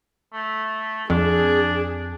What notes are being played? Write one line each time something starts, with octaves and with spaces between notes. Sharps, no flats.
A3
F2 D4 G#4